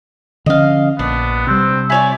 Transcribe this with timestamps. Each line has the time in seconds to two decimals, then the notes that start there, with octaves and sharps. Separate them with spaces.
0.46 D3 F3 C#4 D#5 F5
0.99 A#1 B3 D4
1.47 C3 G3 C4
1.90 E4 C#5 D5 G#5